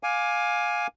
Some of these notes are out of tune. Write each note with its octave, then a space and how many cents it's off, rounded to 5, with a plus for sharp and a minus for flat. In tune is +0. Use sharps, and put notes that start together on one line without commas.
F5 +20 G#5 +0 D6 +5